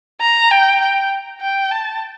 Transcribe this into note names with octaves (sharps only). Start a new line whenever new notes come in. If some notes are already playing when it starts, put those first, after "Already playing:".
A#5
G5
G5
G5
A5